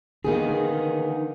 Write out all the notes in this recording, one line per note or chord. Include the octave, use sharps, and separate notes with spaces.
D3 D#3 A#3 B3 D#4 G#4